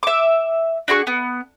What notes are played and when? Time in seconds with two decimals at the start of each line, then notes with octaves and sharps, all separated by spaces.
0.03 E5 D6
0.88 D4 F#4 G#4 C#6
1.07 B3